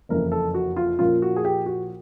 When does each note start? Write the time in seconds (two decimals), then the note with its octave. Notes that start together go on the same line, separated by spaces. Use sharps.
0.09 F#1 F2 C#3 E3 A#4
0.32 A4
0.54 F#4
0.76 F4
0.99 A#2 F3 A#3 C#4 F4
1.22 F#4
1.36 G#4
1.45 G4
1.66 F#4